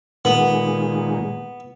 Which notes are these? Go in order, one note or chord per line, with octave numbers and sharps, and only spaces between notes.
A#2 D#3 G#3 B3